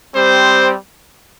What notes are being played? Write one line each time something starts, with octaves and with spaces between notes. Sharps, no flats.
G3 C4 G4 C5